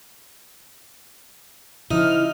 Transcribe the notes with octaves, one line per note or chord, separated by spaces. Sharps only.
C#3 F3 D#4 E4 F6